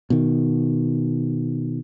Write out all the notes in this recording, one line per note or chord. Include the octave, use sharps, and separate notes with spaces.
B2 D#3